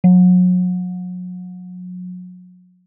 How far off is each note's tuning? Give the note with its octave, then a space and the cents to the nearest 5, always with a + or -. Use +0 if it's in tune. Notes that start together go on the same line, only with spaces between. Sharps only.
F#3 -35